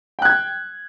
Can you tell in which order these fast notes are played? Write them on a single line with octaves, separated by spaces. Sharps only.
G5 F#6 G#6